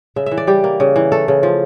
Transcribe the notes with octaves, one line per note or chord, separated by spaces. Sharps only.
C#3 E5
E5
E3
D5
G3 G4
A#3
C#3
E3
A3 A4
C#3
F3